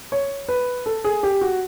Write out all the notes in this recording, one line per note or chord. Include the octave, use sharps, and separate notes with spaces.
C#5
B4
A4
G#4
G4
F#4